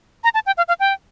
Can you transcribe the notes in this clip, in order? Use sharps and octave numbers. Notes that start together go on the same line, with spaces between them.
A#5
A5
G5
F5
F5
G5